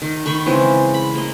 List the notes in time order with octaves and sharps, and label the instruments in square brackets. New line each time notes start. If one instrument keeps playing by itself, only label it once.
[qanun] D#3
D#3 B5 C#6
C#3 E3 G#3 C4
B5
A#3 D#5